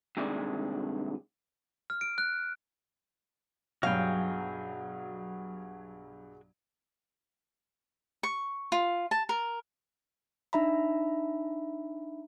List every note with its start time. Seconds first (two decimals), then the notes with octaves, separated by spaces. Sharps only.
0.17 G2 C3 D#3 G#3 D5
1.90 F6
2.01 D7
2.18 F#6
3.83 B1 G2 F#3 F#4 G#4 F5 G5
8.23 C#6
8.72 F4
9.11 A5
9.29 A#4
10.53 D4 D#4 E5 A#5 B5